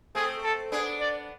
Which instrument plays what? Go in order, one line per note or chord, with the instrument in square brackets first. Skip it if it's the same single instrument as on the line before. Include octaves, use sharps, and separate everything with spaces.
[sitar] A3 C4 [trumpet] G#4
[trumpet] A4
[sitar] B3 D4 [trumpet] G#4
[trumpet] D5